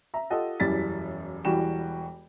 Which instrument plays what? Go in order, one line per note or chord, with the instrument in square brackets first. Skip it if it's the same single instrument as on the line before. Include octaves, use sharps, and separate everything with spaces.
[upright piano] E5 A#5
F4 G4 A4 D#5 F#5
E1 F#2 E3 G3 A6 B6
E1 E3 G3 F#4 G5 E7